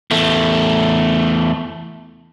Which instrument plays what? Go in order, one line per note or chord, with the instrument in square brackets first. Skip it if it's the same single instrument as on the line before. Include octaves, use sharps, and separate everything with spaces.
[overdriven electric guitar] E2 A3